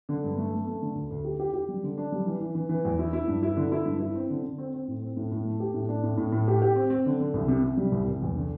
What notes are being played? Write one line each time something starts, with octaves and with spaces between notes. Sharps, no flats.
D3
G2
A3
A3
A3
D3
D2
D2
G4
G4
G4
G3
D3
D4
G3
E3
E3
E3
E3
E2
E4
E4
G2
E4
D3
E4
G2
E4
C4
D3
D3
C4
C4
A2
C4
A2
A2
A3
G4
A2
D4
A2
A2
A2
G4
G4
C4
C4
D3
D3
C2
C3
C3
G3
C2
C2
E2
D3